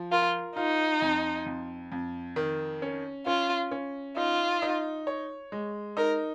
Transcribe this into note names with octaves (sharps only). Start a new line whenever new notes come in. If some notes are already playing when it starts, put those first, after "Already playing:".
Already playing: F3
F4 A#4
D#4 F4
F2
F2
F2
D#3
C#4
C#4 F4
C#4
D#4 F4
D#4
C#5
G#3
D#4 A#4